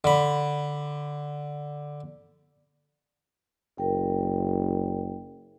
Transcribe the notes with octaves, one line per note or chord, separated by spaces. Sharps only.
D3 B5
F#1 A#4 G5